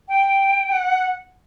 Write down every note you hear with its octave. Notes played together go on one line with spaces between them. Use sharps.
G5
F#5